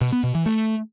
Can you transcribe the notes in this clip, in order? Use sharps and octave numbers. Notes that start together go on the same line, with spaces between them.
B2
B3
B2
E3
A3